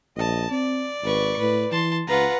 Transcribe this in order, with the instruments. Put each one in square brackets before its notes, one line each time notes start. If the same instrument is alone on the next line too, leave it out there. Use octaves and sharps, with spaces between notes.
[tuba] A#1 [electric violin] D#5 A5
[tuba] C4 [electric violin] D5
[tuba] G#1 [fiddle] B4 C#6
[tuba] A2 [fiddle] B4
[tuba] E3 [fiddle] A5 C6
[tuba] C#2 [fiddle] F4 B4 [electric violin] F#5 A#5